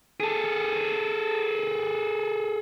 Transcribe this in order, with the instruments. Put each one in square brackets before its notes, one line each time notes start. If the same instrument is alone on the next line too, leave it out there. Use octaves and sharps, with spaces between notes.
[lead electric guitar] G#4 A4